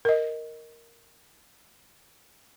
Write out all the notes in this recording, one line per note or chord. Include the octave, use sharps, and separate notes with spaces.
A#4 D#5